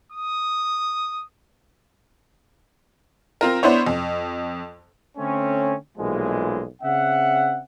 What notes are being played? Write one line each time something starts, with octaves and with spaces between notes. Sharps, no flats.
D#6
C4 F4 A#4
B3 D4 E4 C5 C#5
F2
D3 A3 C4 C#4
B1 A#2 E3 F3 G#3
C#3 C4 E5 F#5